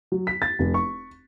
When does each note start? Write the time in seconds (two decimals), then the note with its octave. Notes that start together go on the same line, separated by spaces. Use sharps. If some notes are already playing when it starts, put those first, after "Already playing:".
0.12 F#3
0.27 B6
0.42 A6
0.59 F1
0.74 C#6